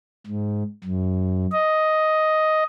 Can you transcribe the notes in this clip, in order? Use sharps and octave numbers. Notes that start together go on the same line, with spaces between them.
G#2
F#2
D#5